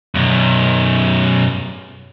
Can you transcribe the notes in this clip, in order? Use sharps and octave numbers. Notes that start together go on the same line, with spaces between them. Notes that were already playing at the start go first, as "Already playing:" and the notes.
F#2 B2